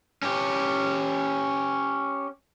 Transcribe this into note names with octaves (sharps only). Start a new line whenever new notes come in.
C#4 G4